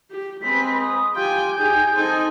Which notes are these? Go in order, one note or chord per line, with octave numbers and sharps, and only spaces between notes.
G4
G#3 C4 B4 B6
D#6
F4 G4 G5 G#5 G6
D#4 G#4 G5
C4 D#4 A4 G#5